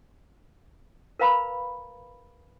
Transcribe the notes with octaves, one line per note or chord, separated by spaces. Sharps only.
A#4 B4 F5 A#5 B5